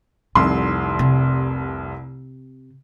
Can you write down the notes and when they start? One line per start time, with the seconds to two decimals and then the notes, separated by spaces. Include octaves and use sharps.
0.35 F1 C2 D#3 C6
0.99 C3